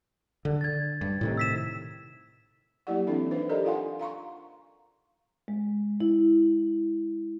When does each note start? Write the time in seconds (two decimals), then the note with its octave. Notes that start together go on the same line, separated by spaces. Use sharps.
0.45 D3
0.61 G#6 A6
1.01 G2
1.21 A2 C3 D#3
1.38 E6 B6 E7
2.87 F#3 A#3 E4 G4 D5 F#5
3.07 E3 C4 D4 A4 C#5 E5
3.31 D4 D#4 B4 C5 E5
3.49 G4 A4 A#4 D5 D#5 A#5
3.65 F4 A4 F5 F#5 G#5 C6
3.99 F5 A#5 C6 C#6
5.48 G#3
6.00 E4